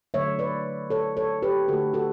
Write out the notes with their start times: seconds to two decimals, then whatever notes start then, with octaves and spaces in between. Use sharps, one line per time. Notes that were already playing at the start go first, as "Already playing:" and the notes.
0.14 D3 F#3 A3 C#5 E5
0.39 B4 D5
0.90 A4 C#5
1.17 A4 C#5
1.42 G4 B4
1.68 D3 A3 F#4 A4
1.94 F#4 A4